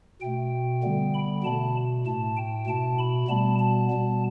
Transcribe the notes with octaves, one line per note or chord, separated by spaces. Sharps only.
B2 A3 G5
D3 G3 B3
B5
B2 A3 A5
A2 A3 A5
G5
B2 A3 A5
B5
B2 G3 B3 A5
A5
B2 G3 B3